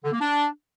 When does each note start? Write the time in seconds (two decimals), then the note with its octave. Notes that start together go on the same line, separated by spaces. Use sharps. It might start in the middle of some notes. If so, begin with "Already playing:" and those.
0.04 D3
0.12 A#3
0.21 D4